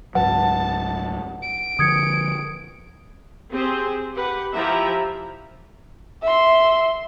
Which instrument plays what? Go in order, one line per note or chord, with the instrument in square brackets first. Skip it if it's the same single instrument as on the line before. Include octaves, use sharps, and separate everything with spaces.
[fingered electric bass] C#2 G#2 F#3 [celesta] B4 [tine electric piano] F#5 [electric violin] A5
[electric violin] D7
[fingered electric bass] D3 F3 [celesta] D#6 G#6 C#7
[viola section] C4 G4 G#4 C5
G4 B4 F#5
F3 E4 G4 E5 A#5 B5
[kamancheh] E5 C6